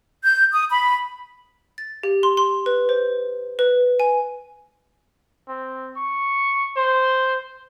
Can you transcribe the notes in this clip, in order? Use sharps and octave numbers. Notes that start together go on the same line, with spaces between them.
G6
D#6
B5
A6
G4
C6
C6
B4
C5
B4
G#5
C4
C#6
C5